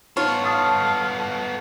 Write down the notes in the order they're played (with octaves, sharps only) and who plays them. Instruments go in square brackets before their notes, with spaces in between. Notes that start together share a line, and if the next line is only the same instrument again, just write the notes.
[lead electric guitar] B3 A4 [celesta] D#4 [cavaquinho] F4 C#5
[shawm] F5 [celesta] A5 D#6 A6